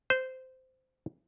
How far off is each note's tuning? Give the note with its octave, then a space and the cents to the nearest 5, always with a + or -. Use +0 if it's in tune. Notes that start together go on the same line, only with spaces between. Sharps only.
C5 -15